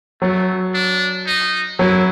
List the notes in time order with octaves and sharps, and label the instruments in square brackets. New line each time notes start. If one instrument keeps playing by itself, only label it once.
[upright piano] F#3 [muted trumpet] A3
[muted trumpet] D4
D#4
[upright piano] F#3 [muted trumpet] E4